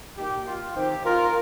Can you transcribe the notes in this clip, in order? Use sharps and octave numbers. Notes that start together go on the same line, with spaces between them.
A#2 A#3 D#4 G4
F4
D#3 C4 D#4 G4
F4 A#4